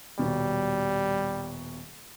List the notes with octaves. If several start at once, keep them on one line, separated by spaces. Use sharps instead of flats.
D#1 B2 G3